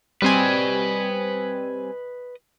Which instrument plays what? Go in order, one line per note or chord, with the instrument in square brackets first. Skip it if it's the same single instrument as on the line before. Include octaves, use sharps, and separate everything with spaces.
[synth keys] G3 C4 G#5 [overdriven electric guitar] B4 D#5